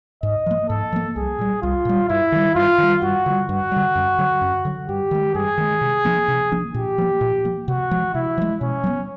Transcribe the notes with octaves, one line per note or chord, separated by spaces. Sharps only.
G#2 D#5
F3 A#3
G#2 A4
F3 A#3
C2 G#4
A#2 G3
C2 F4
A#2 G3
G2 E4
D#3 G3
G2 F4
D#3 G3
G2 F#4
D3 G3
G2 F#4
D3 G3
F#2
D3 F#3
F#2
D3 F#3
G2 G4
D#3 G#3
G2 G#4
D#3 G#3
C3
F3 A#3 D4
C3
F3 A#3 D4
A#2 G4
F3 A#3
A#2
F3 A#3
C3 F#4
F3 G#3
C3 E4
F3 G#3
B2 C#4
F#3 B3